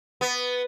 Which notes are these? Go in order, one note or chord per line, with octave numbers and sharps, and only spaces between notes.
B3